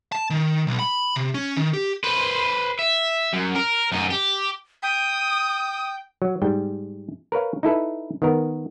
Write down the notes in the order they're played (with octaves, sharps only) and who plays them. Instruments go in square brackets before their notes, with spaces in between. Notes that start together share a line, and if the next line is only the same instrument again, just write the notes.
[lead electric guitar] A5
D#3
B1
B5
C3
C#4
D#3
G4
[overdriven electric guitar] B4 C5
E5
F#2
A#4
F#2 D#4
G4
[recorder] G5 [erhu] D#6
[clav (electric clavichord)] F#3
G#2 G3 G5
A#4 B4 C#5 F5
D#4 E4 A4 B4
D#3 B3 A#4